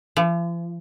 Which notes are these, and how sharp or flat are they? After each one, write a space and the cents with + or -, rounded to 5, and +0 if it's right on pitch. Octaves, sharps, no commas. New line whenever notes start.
F3 -45